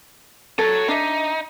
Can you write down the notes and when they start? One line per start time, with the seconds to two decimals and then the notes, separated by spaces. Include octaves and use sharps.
0.58 F#3 A4 C#5
0.88 D4 D#4 E5